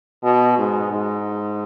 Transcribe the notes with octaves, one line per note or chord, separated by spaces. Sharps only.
B2
G#2
G#2